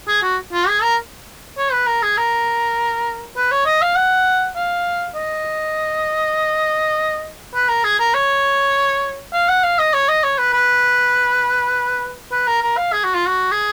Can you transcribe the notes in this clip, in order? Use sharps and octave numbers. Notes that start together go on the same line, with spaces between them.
G#4
F#4
F4
G#4
A#4
C#5
B4
A#4
G#4
A#4
B4
C#5
D#5
F5
F#5
F5
D#5
B4
A#4
G#4
A#4
C#5
F5
F#5
F5
D#5
C#5
D#5
C#5
B4
B4
B4
A#4
A#4
F5
G#4
F#4
F4
F#4
G#4